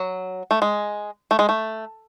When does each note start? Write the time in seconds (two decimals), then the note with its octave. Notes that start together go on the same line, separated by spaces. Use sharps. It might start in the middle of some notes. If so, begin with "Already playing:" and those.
Already playing: F#3
0.51 A3
0.62 G#3
1.31 A3
1.39 G#3
1.49 A3